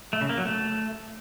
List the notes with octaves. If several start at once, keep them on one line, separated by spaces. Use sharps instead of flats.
A3
C#3
A#3
F#3
A3